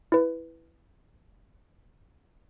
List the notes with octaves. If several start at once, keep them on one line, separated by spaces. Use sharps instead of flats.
E4 B4